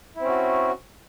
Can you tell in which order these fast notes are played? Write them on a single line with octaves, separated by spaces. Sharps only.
E4 C4 C#4 F#4